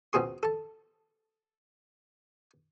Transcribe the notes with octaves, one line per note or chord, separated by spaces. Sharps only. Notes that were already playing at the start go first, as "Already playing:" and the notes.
C#2 B2 C4 G#4 C6
A4 A5